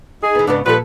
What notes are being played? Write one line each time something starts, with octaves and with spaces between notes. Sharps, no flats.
D#4 G#4
E3 B3
G#2 C#3 B3 D4
A#2 F3 G3 A4 B4